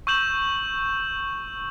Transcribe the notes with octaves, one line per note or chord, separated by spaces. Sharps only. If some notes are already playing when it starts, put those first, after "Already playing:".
C#6 E6 G6 E7 F#7